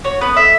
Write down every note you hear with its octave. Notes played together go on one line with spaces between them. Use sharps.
F#4 C#5
B3 B4
A4 E5